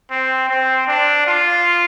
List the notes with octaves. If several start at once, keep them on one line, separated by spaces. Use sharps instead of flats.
C4
C4
D4
F4